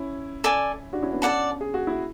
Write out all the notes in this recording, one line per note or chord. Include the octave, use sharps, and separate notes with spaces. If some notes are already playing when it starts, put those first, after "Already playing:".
Already playing: C#4 E4
A4 D5 G#5
D4 F#4
C#4 E4
B3 D4
C#4 A4 D5 F#5 A5
G#4
F#4
E4